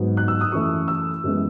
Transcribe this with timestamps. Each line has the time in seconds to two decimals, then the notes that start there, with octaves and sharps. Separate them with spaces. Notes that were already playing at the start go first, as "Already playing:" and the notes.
Already playing: G#2 F#3 B3
0.17 F#6
0.28 E6
0.41 D#6
0.52 F#2 E3 A3 C#6
0.88 E6
1.24 F#2 E3 G#3 B3